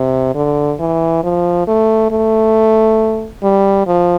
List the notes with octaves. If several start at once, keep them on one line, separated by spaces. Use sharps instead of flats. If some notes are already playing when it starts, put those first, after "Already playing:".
Already playing: C3
D3
E3
F3
A3
A3
G3
F3